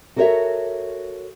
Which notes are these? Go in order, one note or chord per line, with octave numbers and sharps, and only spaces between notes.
F#4 A4 A#4 C5 C#5 E5